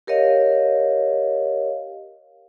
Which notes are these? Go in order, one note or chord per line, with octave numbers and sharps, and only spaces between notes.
G4 A#4 C#5 D#5 F5